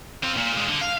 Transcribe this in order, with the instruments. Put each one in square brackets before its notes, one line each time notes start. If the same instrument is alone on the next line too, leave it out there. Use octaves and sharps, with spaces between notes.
[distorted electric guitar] C4 F4
A#2
A#2 G#3
D3
F5